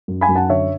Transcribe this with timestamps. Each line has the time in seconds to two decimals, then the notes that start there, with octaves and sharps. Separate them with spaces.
0.08 F#2
0.21 G#5 B5
0.29 F#2
0.35 F#5 A5
0.49 D3 C#5 E5